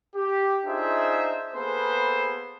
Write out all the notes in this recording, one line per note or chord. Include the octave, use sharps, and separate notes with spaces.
G4
D4 D#4 F4 G#4 C5 E5
A#3 B3 G#4 A4 B4 C5